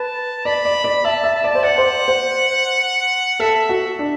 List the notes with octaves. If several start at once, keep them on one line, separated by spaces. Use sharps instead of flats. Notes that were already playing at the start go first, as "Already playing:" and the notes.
Already playing: B4 A5
D5 B5
D5
D5
E5 A5
E5
A5
D5
C5
D5 F#5
C5
C5
A4 E5
F#4
D4